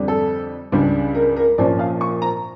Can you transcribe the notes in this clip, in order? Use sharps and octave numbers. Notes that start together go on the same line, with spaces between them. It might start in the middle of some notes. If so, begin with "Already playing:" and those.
Already playing: F2 D3 G3 D4
A4
C#2 C#3 G3 D4
A#4
A#4
A#1 A#2 F3 A#3 C#4 D5
F5
C#6
A#5